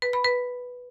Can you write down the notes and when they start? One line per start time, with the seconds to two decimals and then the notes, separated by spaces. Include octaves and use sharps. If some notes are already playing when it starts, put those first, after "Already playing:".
0.02 B4
0.13 B5
0.24 B4